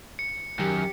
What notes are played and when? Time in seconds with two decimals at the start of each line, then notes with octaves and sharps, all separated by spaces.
0.19 C#7
0.59 F#2 D#3 G4